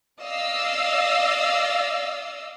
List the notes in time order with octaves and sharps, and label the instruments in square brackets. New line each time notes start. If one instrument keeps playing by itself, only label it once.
[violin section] D5 D#5 F5 E6